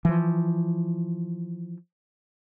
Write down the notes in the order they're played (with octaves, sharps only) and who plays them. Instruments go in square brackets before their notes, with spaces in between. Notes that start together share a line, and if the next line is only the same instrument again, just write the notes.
[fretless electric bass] E3 F3